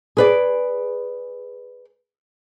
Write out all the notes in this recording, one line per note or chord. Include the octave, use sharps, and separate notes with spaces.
G#4 B4 D5